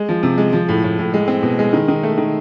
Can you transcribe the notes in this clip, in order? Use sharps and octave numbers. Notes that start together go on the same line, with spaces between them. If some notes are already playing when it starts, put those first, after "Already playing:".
Already playing: G#3
F3
C3
G#3
F3
A2
A2
A2
G#3
C4
B2
G#3
D#3
D#3
A3
D#3